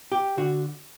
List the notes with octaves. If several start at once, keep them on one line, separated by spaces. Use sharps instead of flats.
G4
D3 F#4